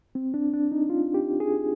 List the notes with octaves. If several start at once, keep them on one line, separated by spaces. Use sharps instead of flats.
C4
D4
D4
D#4
F4
G4
G#4